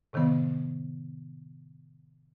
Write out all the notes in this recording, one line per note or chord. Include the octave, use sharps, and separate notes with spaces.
A2 C3 D#3 F3 B3